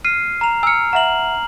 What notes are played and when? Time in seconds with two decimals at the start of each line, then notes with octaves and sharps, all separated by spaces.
0.05 F6 C7 D#7
0.41 A#5 F7
0.63 G#5 E6 F6 C#7
0.93 E5 F#5 A#5 F#7